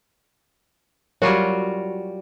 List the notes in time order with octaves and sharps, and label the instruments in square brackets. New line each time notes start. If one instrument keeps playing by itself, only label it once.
[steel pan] F#3 A#4 C#5 [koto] G3 F4 F#4